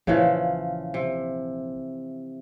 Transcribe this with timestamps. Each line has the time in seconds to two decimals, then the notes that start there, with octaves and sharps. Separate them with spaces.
0.07 A#1 C#3 E3 F3
0.94 C3